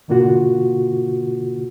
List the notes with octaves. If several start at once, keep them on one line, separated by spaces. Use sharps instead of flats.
G#2 B2 D3 A#3 F4 F#4